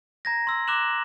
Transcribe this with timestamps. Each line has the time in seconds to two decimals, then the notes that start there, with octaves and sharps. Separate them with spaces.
0.25 A#5 G#6 A#6
0.47 C6 E6
0.67 A#5 D6 F#6 A#6 E7 F#7